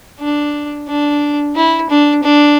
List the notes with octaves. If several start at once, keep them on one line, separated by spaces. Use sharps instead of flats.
D4
D4
E4
D4
D4